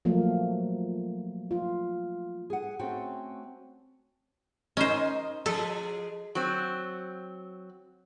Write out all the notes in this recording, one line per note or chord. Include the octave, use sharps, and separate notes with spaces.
F3 F#3 A3 A#3
F4
G#4 F#5
A3 C4 C#4 F#4 G5
C#4 D#4 A#4 C5 D#5
F3 G#3 G#4 A4
F#3 C4